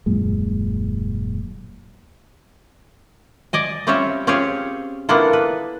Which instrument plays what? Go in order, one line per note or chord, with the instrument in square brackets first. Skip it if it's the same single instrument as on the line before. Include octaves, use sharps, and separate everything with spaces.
[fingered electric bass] D#1 F#2 A#2 G#3
[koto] D5 D#5 G#5
G3 C4 C#4 F4 C#5 E5
C4 C#4 F4 G4 G#4 C#5
A#3 B3 D4 E4 F4 A4
B4